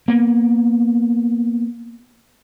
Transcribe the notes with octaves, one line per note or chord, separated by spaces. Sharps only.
A#3 B3